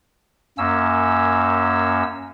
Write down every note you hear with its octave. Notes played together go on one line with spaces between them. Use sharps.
F#2 A#3 C#4 E6